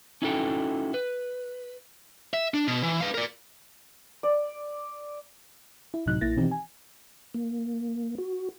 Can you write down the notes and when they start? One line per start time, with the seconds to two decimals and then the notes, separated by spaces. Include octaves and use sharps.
0.22 C#4 D#4 E4 F#4 A4 G5
0.94 B4
2.34 E5
2.54 D4
2.67 B2
2.83 E3
3.01 B4 F5
3.14 A#4 D5
4.23 D5
5.94 E4
6.06 C#2 A2 C3 F#3 D#4 F#6
6.21 A#1 A#3 E4 A6 A#6
6.36 B2 D#3 E3 C4 D#4 G4
6.51 G#5
7.34 A#3
8.18 F#4